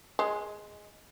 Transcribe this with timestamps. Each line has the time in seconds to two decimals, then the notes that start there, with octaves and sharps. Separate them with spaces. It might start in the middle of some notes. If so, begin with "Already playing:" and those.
0.19 G#3